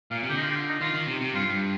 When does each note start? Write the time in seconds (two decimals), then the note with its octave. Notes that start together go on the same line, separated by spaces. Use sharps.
0.11 A#2 F5
0.23 C3
0.29 D3 G4
0.37 D#4
0.42 F4
0.50 G4
0.55 F4
0.68 D#4
0.81 D#3 F4
0.94 D#3
1.07 C3
1.21 C3
1.34 G2 F4
1.50 G2